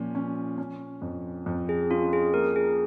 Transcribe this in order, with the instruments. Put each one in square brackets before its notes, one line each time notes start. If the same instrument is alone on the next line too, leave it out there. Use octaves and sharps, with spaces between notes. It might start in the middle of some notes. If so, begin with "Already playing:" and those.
Already playing: [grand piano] A#2 F3 C#4
C#4
C#4
F2
F2
[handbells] G#4
[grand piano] C#4 [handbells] F4
[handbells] G#4
[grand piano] A#3 [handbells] A#4
[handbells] G#4